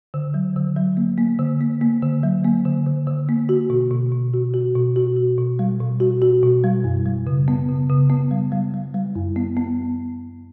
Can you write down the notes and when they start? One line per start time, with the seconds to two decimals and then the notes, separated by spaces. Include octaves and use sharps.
0.14 D3
0.34 F#3
0.56 D3
0.76 F#3
0.97 A#3
1.18 A#3
1.39 D3
1.61 A#3
1.81 A#3
2.02 D3
2.23 F#3
2.45 A#3
2.65 D3
2.86 D3
3.07 D3
3.29 A#3
3.49 F#4
3.70 B2
3.91 B2
4.12 B2
4.34 F#4
4.54 F#4
4.76 B2
4.96 F#4
5.17 F#4
5.38 B2
5.59 G3
5.80 B2
6.00 F#4
6.22 F#4
6.43 B2
6.64 G3
6.84 F#2
7.06 G3
7.27 C#3
7.48 B3
7.69 C#3
7.90 C#3
8.10 B3
8.31 G3
8.52 G3
8.74 G3
8.94 G3
9.15 F#2
9.36 B3
9.57 B3